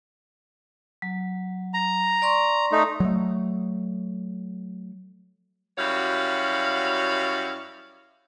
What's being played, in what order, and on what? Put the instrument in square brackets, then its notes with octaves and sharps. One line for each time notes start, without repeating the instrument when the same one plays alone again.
[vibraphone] F#3
[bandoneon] A#5
[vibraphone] D5 C6 C#6
[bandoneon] A3 D#4
[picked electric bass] F#3 A3
[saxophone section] F#2 G3 E4 F#4 C#5 F5